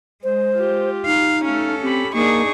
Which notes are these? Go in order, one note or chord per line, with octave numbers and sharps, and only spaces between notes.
G#3 C5
F4 G4
D#4 F5
A3 C#4 A4 F5
C4 G4 B5
A#3 D4 D#4 G#4 C#6